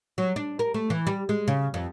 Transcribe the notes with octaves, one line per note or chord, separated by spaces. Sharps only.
F#3
D4
A#4
A3
E3
G3
G#3
C#3
F2